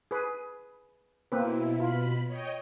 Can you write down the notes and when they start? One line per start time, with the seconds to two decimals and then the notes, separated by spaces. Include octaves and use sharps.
0.11 G#4 B4
1.32 B2 A#3 C4 E4 B4
1.80 B2 F4 B5
2.27 C#5 D#5 G5